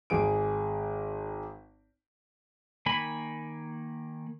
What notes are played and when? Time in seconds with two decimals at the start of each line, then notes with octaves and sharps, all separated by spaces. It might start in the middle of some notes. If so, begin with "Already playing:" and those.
0.10 G#1 G#4 D7
2.86 D#3 A#3 G#5 B5